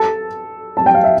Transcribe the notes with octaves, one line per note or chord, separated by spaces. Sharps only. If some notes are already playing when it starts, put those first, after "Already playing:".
Already playing: A4 A5
A5
G5
F5
E5